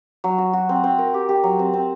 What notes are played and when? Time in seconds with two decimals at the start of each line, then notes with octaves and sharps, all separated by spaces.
0.24 F#3
0.38 F#4
0.53 F#4
0.69 C4
0.84 C4
0.99 A#4
1.14 G4
1.29 G4
1.43 F#3
1.59 C4
1.73 C4